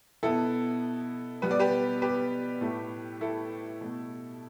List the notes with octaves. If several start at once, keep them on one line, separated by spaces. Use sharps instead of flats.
B2 B3 E4 A4
B2 G3 B3 B4
D5
G4 B4
G4 B4
A2 A3
E4 A4
B2 A3